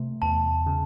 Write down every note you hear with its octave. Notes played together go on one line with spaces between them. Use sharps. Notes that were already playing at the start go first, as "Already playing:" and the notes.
Already playing: C3 A3
E2 A5
C#3